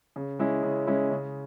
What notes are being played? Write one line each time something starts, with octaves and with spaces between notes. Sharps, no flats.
C#3
G#3 C#4 E4
C#3
G#3 C#4 E4
C#3